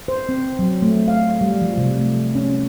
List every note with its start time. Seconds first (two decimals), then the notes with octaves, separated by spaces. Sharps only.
0.08 C5
0.29 C4
0.59 F#3
0.82 A3
1.08 F5
1.41 G3
1.62 F3
1.78 C3
1.99 A3
2.35 C#4